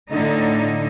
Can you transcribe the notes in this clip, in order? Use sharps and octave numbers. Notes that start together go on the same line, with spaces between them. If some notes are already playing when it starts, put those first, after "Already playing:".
A2 D3 D#4